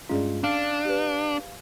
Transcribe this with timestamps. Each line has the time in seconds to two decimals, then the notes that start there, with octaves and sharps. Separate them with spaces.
0.09 G2 G#3 C#4 F4 G#4 D5
0.44 D4 F5
0.85 G4 B4